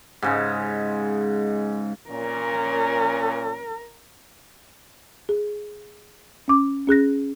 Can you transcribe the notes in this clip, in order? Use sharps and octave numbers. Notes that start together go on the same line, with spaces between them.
G#2 C#3 G#3
A#2 C#4 A#4
G#4
C#4 D6
C#4 G#4 F#6 A#6